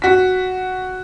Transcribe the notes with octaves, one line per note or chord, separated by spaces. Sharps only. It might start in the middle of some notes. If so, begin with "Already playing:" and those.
F#4 B6